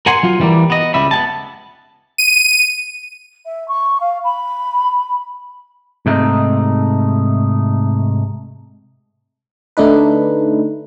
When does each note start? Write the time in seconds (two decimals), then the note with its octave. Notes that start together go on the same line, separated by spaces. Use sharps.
0.06 A#4 F#5 G#5 C6
0.23 F#3 F4
0.40 E3 G3 G#3 A#3
0.70 B3 D#5
0.94 C#2 G3 E5 B5
1.11 B3 G#5 A5
2.18 D#7
3.45 E5
3.68 C#6
4.00 F5
4.24 B5
6.06 G#2 C3 A3 D#4
9.77 D3 A3 D4 D#4 B4